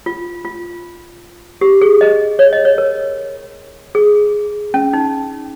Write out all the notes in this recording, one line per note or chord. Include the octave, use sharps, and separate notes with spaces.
F4
F4
G4
G#4
D#5
C#5
D#5
C#5
A#4
G#4
C#4
D#4